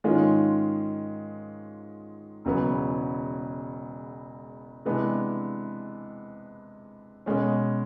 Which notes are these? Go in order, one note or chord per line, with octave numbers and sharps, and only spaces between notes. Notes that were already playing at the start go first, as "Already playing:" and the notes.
G#2 D#3 G#3 C#4 F4
E1 E2 C#3 F#3 B3
C3 E3 G#3 B3 D4
B2 G#3 C#4